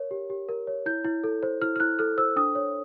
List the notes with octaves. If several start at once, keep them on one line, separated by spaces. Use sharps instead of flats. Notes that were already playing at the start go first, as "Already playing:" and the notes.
Already playing: A#4 C#5
G4
G4
A#4
C#5
E4 G6
E4
A4
C5
E4 F6
F6
E4 F#6
A4 F6
C5 E6
D4 D#6
C#5